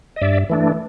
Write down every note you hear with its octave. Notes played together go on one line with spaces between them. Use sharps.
D#5
G2 D5 E5
E3 A3 D4